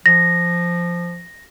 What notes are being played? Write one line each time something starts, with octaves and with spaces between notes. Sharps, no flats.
F3 A#6